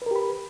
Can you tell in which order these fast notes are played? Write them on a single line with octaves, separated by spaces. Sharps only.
B4 A#4 G4 B5